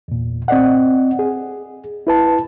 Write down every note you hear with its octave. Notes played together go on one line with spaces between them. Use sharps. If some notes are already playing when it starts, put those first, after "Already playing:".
E2 A#2
C4 D5 D#5 F#5
G#4
E4 B4 A5